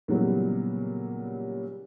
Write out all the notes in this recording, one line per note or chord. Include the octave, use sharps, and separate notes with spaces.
A#2 C#3 E3 F#3 G3 B3